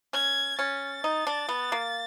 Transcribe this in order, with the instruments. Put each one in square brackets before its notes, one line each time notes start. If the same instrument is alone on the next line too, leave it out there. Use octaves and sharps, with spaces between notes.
[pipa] C#4 [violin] G#6
[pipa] C#4 [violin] A6
[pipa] D#4
D4
B3
A#3